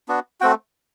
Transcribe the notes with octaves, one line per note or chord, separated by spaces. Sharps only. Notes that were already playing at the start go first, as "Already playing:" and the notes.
B3 D4 F#4
A3 C4 F#4 G5